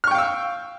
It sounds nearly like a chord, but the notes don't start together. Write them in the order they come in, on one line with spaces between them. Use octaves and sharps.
F6 C#6 G5 F5 E6